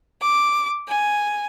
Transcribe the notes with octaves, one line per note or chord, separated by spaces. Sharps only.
D6
G#5